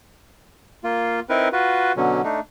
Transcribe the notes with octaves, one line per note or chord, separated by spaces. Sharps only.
A#3 F4
C4 D#4 E4 A#4 B4
F4 F#4 B4
B2 D3 F#3 C#4
A3 D4 D#4